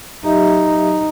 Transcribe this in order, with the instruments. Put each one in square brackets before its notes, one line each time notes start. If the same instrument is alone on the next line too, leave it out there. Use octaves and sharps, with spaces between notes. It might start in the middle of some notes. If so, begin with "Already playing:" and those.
[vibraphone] F#3 G4 E5 [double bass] D#4